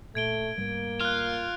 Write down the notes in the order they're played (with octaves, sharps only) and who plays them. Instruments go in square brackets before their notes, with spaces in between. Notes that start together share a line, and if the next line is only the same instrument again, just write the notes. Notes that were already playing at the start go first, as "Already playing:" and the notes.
[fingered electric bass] A#2 [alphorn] A3 [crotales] G#6 D7 G7
[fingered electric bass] G#2 G3 A3 [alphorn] A#3
[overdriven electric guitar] F4 [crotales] F6 F#6